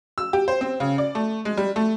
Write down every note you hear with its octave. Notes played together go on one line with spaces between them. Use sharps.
E6
G4
C5
C4
C#3
D5
A3
G#3
G3
A3